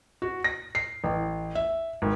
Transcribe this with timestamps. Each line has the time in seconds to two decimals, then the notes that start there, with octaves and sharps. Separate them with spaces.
0.22 F#4
0.44 A#6
0.75 C7
1.04 A1
1.55 E5
2.02 G#1